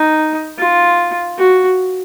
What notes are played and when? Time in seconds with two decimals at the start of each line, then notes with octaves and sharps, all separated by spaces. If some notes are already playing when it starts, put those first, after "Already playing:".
Already playing: D#4
0.58 F4
1.38 F#4